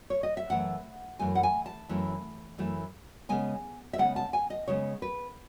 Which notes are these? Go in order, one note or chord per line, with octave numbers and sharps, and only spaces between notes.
C#5
D#5
E5
F#2 E3 A3 F#5
F#2 E3 A3 G#5
F#5
G#5
A5
F#2 E3 A3
F#2 E3 A3
C#3 G#3 B3 G#5
E5
C#3 G#3 B3 F#5
A5
G#5
D#5
C#3 G#3 B3 C#5
B4